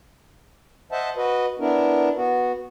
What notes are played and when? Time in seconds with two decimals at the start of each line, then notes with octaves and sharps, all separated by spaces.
0.92 C5 D#5 E5 F#5 A5
1.17 F#4 B4 D#5
1.60 B3 D4 E4 A#4
2.16 B3 F#4